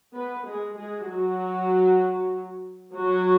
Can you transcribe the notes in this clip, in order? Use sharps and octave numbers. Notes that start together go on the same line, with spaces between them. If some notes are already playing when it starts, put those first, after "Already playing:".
B3 B4
G#3 G#4
G#3 G#4
F#3 F#4
F#3 F#4